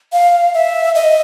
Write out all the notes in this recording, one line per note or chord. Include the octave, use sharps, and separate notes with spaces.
F5
E5
D#5